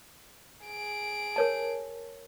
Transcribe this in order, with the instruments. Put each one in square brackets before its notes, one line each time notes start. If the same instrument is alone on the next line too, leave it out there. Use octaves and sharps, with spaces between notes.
[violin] G#4 D7
[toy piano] A#4 C#5 A5